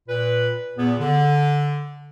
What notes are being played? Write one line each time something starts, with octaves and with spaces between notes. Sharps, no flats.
A#2 B4
E2 A#2 B3
D3